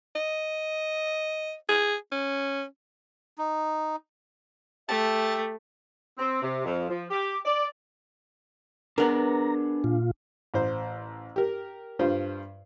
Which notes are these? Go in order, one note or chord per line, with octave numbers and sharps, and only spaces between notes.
D#5
G#4
C#4
D#4
A3 G4 E5 A5
C4
C3
F2
F3
G4
D5
B3 D4 G#4 A#4 F#5 A#5
A#2 F4
A1 C5
G4 A#4
G2 F4 C5